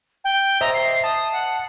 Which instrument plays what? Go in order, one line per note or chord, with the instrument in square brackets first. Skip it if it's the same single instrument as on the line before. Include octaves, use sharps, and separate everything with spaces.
[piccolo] G5
[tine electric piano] C5 D#5 E5 [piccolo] A#5
[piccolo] C7
[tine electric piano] A5 [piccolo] D#6
[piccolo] F#5